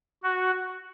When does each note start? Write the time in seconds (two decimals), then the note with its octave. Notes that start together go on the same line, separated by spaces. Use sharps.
0.23 F#4